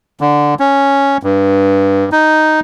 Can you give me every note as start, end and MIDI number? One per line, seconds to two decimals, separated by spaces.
0.21 0.55 50
0.60 1.17 61
1.23 2.09 43
2.12 2.60 63